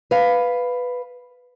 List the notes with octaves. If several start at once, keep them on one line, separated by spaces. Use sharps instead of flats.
B4 F5